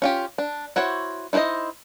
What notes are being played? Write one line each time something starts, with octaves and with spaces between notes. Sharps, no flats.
C#4 F4 G4
D4
E4 F#4 C5 C#5
D#4 E4 B4 C5 D#5